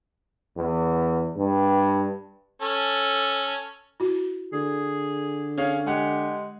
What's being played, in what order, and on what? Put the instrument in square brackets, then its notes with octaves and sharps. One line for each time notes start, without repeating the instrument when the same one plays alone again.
[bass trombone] E2
G2
[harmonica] C#4 A4
[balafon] E4 F#4
[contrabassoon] D3 [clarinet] G#4
[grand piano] C#4 G#4 F5 [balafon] C#5 D5
[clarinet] G#3 [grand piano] G4 F#5 G#5